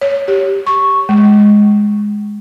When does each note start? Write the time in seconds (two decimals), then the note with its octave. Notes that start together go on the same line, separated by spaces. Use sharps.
0.01 C#5
0.28 G4
0.67 C#6
1.09 G#3